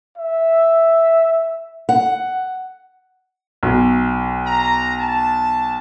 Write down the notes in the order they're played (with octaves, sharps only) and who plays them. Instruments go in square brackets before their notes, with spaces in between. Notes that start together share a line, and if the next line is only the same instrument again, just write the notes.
[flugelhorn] E5
[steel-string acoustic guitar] F#5
[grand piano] B1
[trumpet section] A#5
A5